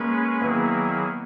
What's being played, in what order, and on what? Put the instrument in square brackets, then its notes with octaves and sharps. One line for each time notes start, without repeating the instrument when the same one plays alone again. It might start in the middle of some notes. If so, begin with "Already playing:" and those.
Already playing: [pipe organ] G#3 C#4 G#4 B4 [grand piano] A#3
[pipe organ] D#3 F#3 A#3 E4 G#4 [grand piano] B3